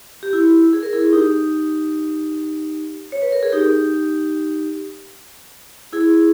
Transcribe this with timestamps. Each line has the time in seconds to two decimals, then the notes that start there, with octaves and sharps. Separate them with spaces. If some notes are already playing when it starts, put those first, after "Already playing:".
0.23 G4
0.33 E4
0.73 G#4
0.83 A#4
0.93 E4 G#4
1.13 D#4 G4
3.12 C#5
3.22 B4
3.33 A#4
3.43 G#4
3.52 D#4 G4
5.92 E4 G#4